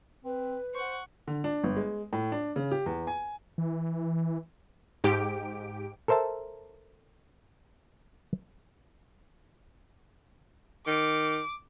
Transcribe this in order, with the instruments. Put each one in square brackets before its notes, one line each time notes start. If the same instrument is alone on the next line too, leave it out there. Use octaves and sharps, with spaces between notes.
[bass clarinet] C4 [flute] B4
[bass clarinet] C5 [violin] F#5 C#6
[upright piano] D3
D4
G1
G#3
A2
D4
C#3
G4
E2
G#5
[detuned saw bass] E3
[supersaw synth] G#2 G4 D7
[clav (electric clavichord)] A4 A#4 C5 E5 A5
[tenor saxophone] D#3 [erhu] D6